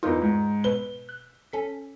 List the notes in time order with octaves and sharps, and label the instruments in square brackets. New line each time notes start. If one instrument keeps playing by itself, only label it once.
[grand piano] E2 D#4 [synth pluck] F4 A#4
[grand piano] G#2
[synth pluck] B2 B4 F#6 [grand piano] G7
[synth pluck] F#6
C#4 A4 B6